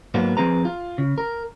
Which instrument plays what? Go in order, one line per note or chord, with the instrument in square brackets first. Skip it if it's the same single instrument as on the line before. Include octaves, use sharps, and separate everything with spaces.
[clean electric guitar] G#2 F#3 A#3 B3
F3 C4 G#4 B4 A#5
F4
C#3
A#4